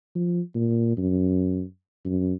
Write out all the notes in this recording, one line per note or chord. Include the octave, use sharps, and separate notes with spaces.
F3
A#2
F#2
F#2